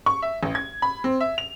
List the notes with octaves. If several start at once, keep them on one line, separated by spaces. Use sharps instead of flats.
C#6
E5
A1
G#6
B5
C4
E5
F7